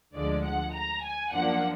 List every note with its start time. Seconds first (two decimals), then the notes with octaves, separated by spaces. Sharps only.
0.15 D2 D3 F3 G#3 D5
0.45 F#5
0.74 A#5
1.04 G#5
1.33 F#2 F3 A#3 D4 F#5